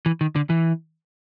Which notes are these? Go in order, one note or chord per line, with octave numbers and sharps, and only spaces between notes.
E3
D#3
D3
E3